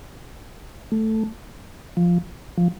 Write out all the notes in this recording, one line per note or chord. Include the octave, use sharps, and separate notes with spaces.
A3
F3
F3